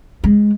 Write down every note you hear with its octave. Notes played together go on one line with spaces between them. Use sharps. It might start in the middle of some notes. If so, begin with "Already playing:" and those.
G#3